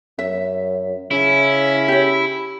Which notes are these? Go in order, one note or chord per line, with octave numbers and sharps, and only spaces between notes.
F#2 E5
C#3 C#4 E4
G4 C#5